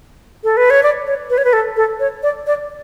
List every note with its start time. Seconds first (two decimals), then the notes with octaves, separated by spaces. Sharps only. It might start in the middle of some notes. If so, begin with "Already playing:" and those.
0.44 A4
0.57 B4
0.70 C#5
0.83 D5
1.07 C#5
1.30 B4
1.38 C#5
1.45 B4
1.53 A4
1.76 A4
2.00 C#5
2.23 D5
2.47 D5